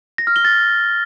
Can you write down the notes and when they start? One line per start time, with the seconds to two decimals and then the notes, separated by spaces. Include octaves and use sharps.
0.18 A#6
0.27 F6
0.36 G7
0.45 A6